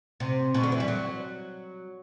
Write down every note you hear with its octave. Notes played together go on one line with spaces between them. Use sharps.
C3
B2
D3
E3
G3
F#3